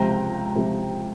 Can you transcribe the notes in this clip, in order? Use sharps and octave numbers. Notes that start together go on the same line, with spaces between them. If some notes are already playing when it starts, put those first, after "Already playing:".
Already playing: C#2 C3 F3 G5 A#5
C#2 C3 F3